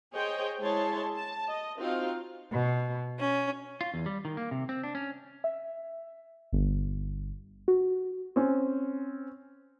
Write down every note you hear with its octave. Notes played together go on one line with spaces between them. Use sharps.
G#4 C5 C#5 D#5 G5
G#3 E4 G#4 C#5 A5 C6
A5
D#5
C4 D#4 F4 F#4 F5
B2
C#4
F4
E2
G3
D#3
A#3
C3
C4
D4
C#4
E5
G1
F#4
C4 C#4